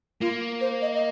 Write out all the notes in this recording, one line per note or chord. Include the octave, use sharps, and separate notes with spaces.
A#3 F4
C5
D#5
D#5